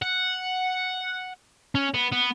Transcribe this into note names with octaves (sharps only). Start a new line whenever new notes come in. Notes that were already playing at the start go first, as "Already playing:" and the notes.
F#5
C#4
B3
B3